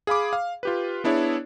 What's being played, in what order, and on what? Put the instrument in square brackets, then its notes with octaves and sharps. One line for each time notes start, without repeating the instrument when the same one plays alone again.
[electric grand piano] G#4 F5 B5 D6
F5
F4 G4 B4
B3 D4 E4 G#4 C#5 D5